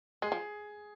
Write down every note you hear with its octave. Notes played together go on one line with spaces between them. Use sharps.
G#3 G#4
F3